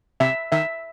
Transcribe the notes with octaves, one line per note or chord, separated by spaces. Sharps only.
C3 E5
D#3 E5